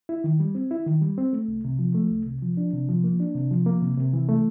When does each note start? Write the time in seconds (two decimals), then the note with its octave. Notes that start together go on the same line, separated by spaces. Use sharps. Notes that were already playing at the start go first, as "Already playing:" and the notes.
0.09 E4
0.24 D#3
0.40 G3
0.55 C4
0.71 E4
0.86 D#3
1.02 G3
1.18 C4
1.33 A3
1.48 C2
1.65 C3
1.79 F3
1.94 A3
2.10 C2
2.26 C3
2.42 F3
2.57 D4
2.73 C3
2.89 F3
3.04 A#3
3.20 D4
3.35 C3
3.51 F3
3.66 A#3
3.81 C3
3.98 C3
4.13 E3
4.29 A3